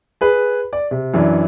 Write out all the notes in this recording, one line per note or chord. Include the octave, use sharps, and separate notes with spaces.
G#4 B4
D5
C3
F#2 E3 F#3 D4